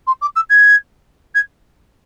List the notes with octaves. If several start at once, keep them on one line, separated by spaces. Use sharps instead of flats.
C6
D6
E6
G#6
G#6